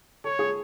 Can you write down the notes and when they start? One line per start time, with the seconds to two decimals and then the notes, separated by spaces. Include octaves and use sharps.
0.24 A4 C#5
0.39 G#4